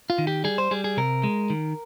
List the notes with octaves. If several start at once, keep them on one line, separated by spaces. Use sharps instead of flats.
F4
D#3
G4
G3 G#4
C5
G3 G#4
G#4
C3 A#4
G#3
D#3